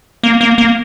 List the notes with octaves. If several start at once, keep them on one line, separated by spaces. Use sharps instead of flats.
A#3
A#3
A#3